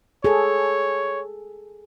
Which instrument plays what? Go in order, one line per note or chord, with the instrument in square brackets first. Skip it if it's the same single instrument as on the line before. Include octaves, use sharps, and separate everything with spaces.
[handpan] G#4 A4 [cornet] C#5